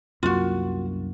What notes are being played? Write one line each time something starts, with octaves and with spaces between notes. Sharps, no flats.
C2 F#2 A#3 F4 F#4